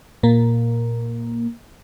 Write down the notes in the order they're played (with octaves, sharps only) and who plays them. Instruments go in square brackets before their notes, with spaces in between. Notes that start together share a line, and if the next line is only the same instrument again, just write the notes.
[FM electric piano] A#2 A#3